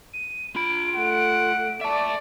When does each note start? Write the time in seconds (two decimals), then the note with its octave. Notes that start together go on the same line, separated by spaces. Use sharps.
0.13 D#7
0.56 F4 B5 D7
0.96 A3 F#5
1.81 D5 E5 A5